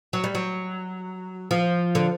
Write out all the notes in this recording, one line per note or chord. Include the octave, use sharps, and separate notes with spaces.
F#3
G3
F#3
F3
D3